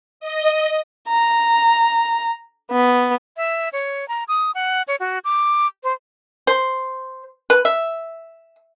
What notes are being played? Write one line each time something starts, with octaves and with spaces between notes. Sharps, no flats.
D#5
A#5
B3
E5
C#5
A#5
D#6
F#5
C#5
F#4
D6
C5
C5
B4
E5